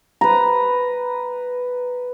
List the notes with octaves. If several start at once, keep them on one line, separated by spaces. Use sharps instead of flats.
B4 A#5